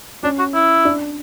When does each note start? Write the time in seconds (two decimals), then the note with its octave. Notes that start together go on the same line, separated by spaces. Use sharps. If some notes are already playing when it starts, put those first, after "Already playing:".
0.23 C#4 D4
0.39 F#4
0.54 E4
0.85 D4